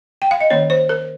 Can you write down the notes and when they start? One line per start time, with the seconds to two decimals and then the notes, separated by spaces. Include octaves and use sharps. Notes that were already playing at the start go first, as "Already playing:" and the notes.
0.22 G5
0.31 F5
0.41 D#5
0.50 D#3 A#3 C#4 C#5
0.70 C5
0.89 A#4